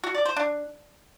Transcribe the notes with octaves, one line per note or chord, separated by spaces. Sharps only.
F#4
D5
C5
D4